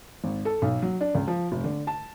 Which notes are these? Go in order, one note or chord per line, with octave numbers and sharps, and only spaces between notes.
G#1
A4
B1
F#3
D4
C#2
F3
F1
D3
A5